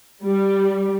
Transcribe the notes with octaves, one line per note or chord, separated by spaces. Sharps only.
G3